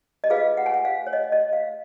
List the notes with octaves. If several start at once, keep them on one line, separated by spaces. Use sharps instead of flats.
D#5
F4 G#4 B4 F5
F#5
G#5
F#5
F5
C#5
D#5
D#5
F5